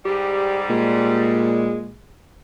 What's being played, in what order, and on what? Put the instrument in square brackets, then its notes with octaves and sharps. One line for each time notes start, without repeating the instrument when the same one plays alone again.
[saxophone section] G#2 G3 [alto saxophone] G4
[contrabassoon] A#2 [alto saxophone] G#3